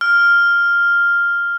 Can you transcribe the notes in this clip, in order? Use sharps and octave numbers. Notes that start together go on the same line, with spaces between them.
F6